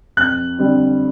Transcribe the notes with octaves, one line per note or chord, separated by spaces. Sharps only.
F2 F#6
D3 G3 C4